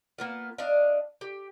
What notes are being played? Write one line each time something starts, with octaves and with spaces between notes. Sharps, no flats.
A#3 B3 F4
D4 D5 D#5 F5
G4